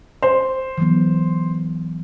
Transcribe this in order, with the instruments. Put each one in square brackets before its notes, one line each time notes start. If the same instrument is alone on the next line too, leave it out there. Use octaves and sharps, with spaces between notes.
[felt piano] C5
[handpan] E3 F#3 B3